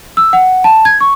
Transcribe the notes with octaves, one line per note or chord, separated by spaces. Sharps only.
E6
F#5
A5
G#6
C#6